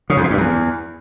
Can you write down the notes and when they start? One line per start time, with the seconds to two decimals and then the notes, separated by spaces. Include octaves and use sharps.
0.10 C#3
0.17 F2
0.24 B2
0.30 G2
0.37 E2